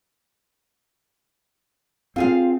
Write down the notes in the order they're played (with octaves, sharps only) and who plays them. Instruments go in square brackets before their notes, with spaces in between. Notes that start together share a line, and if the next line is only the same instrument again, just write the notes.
[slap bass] C4 [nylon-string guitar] F4 G#4 F5